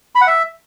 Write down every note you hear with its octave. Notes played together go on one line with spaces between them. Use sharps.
B5
F#5
E5